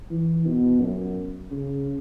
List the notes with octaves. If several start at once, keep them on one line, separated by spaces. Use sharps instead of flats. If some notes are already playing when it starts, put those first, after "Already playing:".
E3
B2
F#2
C#3